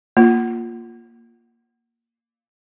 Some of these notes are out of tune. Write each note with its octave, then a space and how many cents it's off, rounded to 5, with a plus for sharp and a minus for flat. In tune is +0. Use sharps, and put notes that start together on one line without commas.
A#3 +0 F4 +0